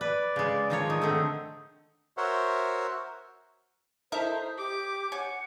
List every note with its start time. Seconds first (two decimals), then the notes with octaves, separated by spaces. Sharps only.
0.01 B4 D5
0.36 C#3 G#3
0.70 D#3 F3 C#5
0.90 D#3 D#5
1.02 D3 A3 C4
2.17 F#4 A#4 C5 C#5 E5 F#5
4.12 D#4 E4 A4 A#4 C5
4.58 G4 D6
5.12 C#5 F#5 G#5